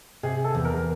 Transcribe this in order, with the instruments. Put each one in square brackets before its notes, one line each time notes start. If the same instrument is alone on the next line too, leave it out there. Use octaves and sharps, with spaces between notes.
[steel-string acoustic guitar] C3 [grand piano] G#4
[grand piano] A4
[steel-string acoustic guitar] E2
[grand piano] A#4